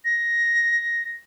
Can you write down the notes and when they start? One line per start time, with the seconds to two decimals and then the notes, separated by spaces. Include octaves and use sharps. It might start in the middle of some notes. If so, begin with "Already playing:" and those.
0.04 A#6